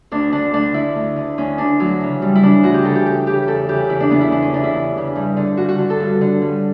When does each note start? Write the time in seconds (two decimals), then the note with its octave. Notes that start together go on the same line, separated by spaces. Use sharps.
0.11 D2 D4
0.32 D3 D4
0.53 D2 D4
0.74 D3 E4
0.96 D2
1.16 D3
1.38 D2 C#4
1.58 D3 D4
1.80 D2 F#3
2.01 C#3 E3
2.21 D2 G3
2.35 E4
2.43 C#3 E3 D4
2.63 D2 F#4
2.74 G4
2.84 C#3 E3 A4
2.95 G4
3.06 D2 G4
3.26 C#3 E3 G4
3.47 E2 A4
3.69 C#3 E3 G4
3.89 E2 E4
4.00 D4
4.10 C#3 E3 B3
4.21 E4
4.31 E2 D4
4.42 C#4
4.53 C#3 E3 D4
4.64 E4
4.74 E2
4.95 C#3 E3
5.16 G2
5.37 D3
5.57 G2 F#4
5.69 F#4
5.79 D3
5.90 A4
6.00 G2
6.21 D3
6.42 G2